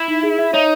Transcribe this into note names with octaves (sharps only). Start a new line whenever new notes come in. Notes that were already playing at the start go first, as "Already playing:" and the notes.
Already playing: E4
D#4
G#4
E5
D#4 C#5